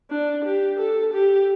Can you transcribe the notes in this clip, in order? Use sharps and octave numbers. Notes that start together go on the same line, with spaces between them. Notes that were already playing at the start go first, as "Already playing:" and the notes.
D4
G4
A4
G4